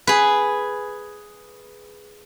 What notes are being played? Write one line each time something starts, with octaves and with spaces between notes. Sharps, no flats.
G#4 B4